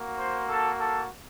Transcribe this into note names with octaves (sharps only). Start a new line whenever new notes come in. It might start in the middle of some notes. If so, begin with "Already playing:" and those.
Already playing: A#3 F#4
C5 C6
A4 A5
A4 A5